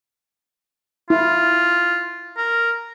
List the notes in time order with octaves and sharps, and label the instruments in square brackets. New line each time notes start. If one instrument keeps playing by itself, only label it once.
[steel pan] E4 [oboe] F4
[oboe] A#4